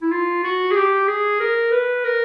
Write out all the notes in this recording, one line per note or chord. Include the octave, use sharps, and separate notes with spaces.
E4
F4
F#4
G#4
G4
G#4
A#4
B4
A#4